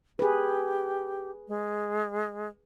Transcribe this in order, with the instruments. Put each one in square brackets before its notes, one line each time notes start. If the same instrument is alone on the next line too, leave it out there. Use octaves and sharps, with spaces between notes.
[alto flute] G4 [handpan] G#4 B4
[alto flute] G#3